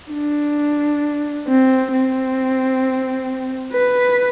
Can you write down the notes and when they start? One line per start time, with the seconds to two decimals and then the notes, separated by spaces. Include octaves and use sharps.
0.13 D4
1.48 C4
1.93 C4
3.73 B4